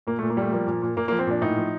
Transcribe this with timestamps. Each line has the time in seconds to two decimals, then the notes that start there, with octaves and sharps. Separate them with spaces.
0.07 A#2 A#3
0.19 A3
0.22 A#2
0.30 A#3
0.37 G3 A3
0.52 F3 A#3
0.67 A#2
0.82 A#2
0.96 A#2 A#3
1.08 A#3
1.12 F3
1.19 C4
1.27 A#2 D4
1.41 A2 D#4
1.57 F3